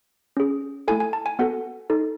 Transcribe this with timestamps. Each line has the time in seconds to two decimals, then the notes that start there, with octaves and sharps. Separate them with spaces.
0.37 C#4 G#4
0.88 A3 E4 A4 G#5
1.00 G#5
1.13 A5
1.26 G#5
1.39 B3 F#4 A4 F#5
1.90 D#4 A4